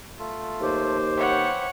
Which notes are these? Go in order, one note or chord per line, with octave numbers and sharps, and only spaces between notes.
A3 F4 A4
D#2 C5 D6
B4 C#5 E5 F#5 G5